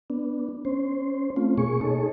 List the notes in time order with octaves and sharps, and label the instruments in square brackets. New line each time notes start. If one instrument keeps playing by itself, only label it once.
[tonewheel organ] B3 D4
C#4 C5
A3 C4 C#4 F4
B2 A#3 G#4 C#6
D#4 G#4 A4 C#5